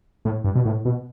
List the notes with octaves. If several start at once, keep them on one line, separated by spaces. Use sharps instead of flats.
A2
G2
B2
A2
B2